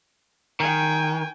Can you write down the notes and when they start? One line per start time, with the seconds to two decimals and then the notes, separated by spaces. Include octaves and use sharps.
0.60 D#3 G5 G#5